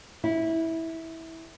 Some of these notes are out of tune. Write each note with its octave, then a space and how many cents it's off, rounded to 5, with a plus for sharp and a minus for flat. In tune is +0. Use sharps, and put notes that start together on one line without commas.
E4 -15